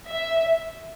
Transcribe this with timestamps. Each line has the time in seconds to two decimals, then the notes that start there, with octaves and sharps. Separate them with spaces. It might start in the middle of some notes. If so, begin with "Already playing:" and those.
0.11 E5